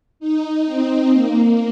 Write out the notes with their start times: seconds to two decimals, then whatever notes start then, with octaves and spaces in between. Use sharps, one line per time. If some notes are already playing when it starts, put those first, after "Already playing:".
0.20 D#4
0.66 C4
1.12 A#3